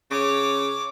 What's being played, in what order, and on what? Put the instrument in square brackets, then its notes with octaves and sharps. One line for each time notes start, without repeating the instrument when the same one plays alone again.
[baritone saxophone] C#3 [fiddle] C#5 D6